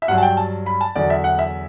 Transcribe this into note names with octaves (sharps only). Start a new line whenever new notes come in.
E5
G2 F#3 F#5
A5
G5
A5
B5
A5
E2 D3 F#3 D5
E5
F#5
E5